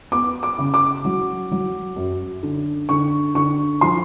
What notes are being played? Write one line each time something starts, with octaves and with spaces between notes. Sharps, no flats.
B3 D6
D6
C#3
D6
F#3
F#3
F#2
D3
D3 C#6
D3 C#6
F3 C6